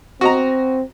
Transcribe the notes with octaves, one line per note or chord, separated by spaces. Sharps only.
C4 F#4 D#5 A#5